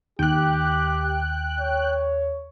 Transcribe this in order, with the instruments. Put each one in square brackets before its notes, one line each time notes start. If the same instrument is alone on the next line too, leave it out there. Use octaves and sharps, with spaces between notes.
[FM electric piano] D#2 [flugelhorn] G4 [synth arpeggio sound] G5 F#6
[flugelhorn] C#5